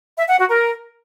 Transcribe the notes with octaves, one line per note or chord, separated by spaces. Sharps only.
E5
F#5
F#4
A#4